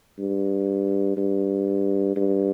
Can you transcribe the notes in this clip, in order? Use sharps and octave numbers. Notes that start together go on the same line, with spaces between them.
G2
G2
G2